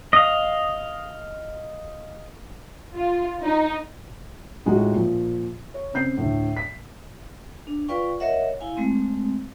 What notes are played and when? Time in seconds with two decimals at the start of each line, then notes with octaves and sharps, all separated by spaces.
0.13 D#5 F5
2.95 F4
3.42 D#4
4.66 A2 G#3 D#4 F4 F#4
4.94 A#2 F3
5.74 C#5
5.94 C#3 C4 G6 C7
6.17 D2 A2
6.57 B6
7.67 D4
7.88 F4 B4 D5 F5 G5 C#6
8.20 A#4 C#5 D#5 E5 F#5
8.61 E4 F5 G#5
8.77 G#3 A3 C4